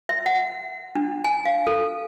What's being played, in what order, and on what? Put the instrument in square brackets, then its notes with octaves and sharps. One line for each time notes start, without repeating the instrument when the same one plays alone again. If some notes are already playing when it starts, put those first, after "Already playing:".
[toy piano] E5
F#5
D4
G#5
F5
A4